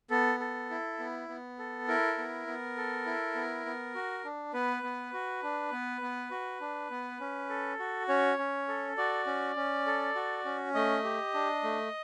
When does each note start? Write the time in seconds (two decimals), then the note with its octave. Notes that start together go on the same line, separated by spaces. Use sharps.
0.10 B3 A4
0.40 A4
0.70 E4
0.99 B3
1.28 B3
1.59 A4
1.88 E4 A#4
2.18 B3
2.47 B3
2.77 A4
3.06 E4
3.35 B3
3.66 B3
3.95 F#4
4.24 D4
4.53 B3 B4
4.83 B3
5.13 F#4
5.43 D4
5.72 B3
6.01 B3
6.31 F#4
6.60 D4
6.91 B3
7.20 C#4
7.49 A4
7.79 F#4
8.08 C#4 C#5
8.39 C#4
8.68 A4
8.97 F#4 D5
9.26 C#4
9.56 C#4
9.86 A4
10.15 F#4
10.45 C#4
10.74 A3 D#5
11.04 G4
11.34 D4
11.63 A3